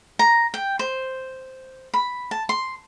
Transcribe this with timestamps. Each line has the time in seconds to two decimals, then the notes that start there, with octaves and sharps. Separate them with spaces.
0.19 A#5
0.54 G5
0.79 C5
1.94 B5
2.31 A5
2.49 C6